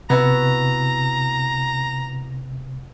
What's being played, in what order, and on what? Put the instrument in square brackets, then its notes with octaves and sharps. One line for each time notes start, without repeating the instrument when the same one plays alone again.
[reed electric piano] C3 [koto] B3 E4 F#4 [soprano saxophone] A#5